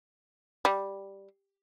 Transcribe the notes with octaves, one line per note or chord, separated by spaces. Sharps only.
G3